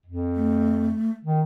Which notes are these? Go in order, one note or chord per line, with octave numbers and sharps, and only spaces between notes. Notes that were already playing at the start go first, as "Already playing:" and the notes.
F2
A3
D#3